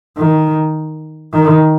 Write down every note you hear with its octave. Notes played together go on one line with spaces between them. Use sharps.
D#3
D#3